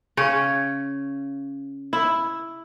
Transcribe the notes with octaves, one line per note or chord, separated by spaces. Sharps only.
C#3 C#4 C#5
E4